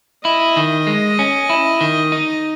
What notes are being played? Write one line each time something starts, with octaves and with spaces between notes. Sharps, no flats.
E4 D#5
D#3
G#3
C#4
E4
D#3
D#4